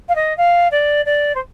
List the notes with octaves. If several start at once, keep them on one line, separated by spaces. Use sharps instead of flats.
F5
D#5
F5
D5
D5
C5